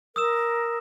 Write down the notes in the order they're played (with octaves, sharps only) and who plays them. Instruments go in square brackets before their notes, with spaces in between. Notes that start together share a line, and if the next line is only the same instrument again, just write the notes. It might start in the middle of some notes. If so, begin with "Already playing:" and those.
[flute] A#4 [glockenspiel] D#6 E6 E7